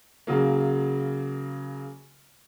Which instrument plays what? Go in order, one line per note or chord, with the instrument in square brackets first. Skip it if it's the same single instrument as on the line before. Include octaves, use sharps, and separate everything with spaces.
[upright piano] C#3 F#3 A#3